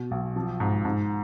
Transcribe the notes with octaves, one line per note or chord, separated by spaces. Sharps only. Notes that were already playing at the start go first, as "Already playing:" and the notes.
Already playing: B2
B1
F3
G#2
G#2